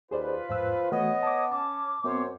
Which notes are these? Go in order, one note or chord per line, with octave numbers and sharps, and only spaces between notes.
D#2 F4 G#4 B4 C5 D5
E2 G#2 F3 E6
E3 A3 B3 F#4 C#5 D#5
A5 D6 D#6
C#4 A5 D6
F#2 B3 C4 C5 C#5